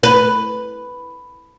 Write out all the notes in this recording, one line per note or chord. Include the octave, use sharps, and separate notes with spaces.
B4